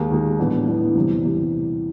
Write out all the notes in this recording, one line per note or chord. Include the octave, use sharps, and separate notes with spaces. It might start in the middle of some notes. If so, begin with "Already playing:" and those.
Already playing: D#2 D#3 G#3
D#2 D#3 G#3
A2 E3 G3 B3 D4
A2 E3 G3 B3 D4
E2 C3 E3 G3
C3 E3 G3